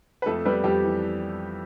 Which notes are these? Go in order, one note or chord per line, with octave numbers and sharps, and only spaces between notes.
B4
F2 A3 A4
G3 B3 B4
F2 G3 G4
E3